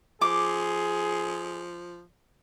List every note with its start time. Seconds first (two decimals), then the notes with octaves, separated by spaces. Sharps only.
0.21 F3 G#4 D6